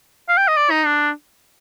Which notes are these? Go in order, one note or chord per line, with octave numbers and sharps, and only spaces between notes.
F5
G5
D#5
D5
D#4
D4